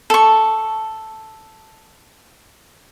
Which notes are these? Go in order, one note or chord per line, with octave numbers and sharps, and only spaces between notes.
A4 C#6